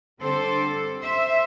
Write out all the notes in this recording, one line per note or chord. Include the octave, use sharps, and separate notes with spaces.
D3 G3 C4 A4 C5
C5 E5